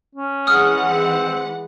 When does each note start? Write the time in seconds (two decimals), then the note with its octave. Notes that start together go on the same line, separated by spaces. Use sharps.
0.15 C#4
0.47 E3 G#3 F#5 D#6 F6
0.89 C4